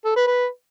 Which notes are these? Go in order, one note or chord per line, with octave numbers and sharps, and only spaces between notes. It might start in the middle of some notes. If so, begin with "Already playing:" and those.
A4
B4
B4